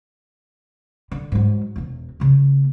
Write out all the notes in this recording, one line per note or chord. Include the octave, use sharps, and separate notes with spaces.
D3
G#2 F#3
E1 E2
C#3 A#3